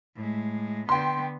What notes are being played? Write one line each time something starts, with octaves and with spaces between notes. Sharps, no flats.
A2 G#3
D3 B3 G5 C6